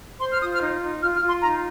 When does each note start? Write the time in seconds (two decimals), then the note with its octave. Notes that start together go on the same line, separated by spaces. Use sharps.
0.21 C5 C6
0.32 F6
0.41 F4 D#6
0.52 F6
0.62 D#4
0.81 D#4
1.02 F4 F6
1.15 F6
1.22 F4
1.28 C6
1.41 D#4 A#5